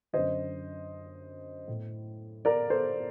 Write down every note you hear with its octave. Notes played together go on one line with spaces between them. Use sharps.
F#2 D3 C5 D#5
A2
A#4 D5
A4 C5